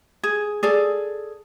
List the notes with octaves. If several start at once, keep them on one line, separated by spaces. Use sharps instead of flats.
G#4
G#4 A4 D5